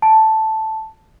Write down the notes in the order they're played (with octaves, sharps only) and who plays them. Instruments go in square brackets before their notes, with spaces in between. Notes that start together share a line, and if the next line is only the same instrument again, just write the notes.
[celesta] A5